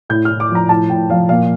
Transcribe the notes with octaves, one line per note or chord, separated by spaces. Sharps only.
A2 G6
A2 F6
D6
F3
A#5
A2 A5
A2 G5
F3 F5
A#2 F5